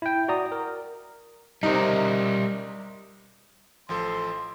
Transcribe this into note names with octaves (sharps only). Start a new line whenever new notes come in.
E4 G5
F#4 D5 A#5 D#6
A#4
C3 G3 D#4 A#4
A1 F3 A4 C6